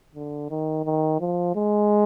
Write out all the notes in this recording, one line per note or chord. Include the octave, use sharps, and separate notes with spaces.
D3
D#3
D#3
F3
G#3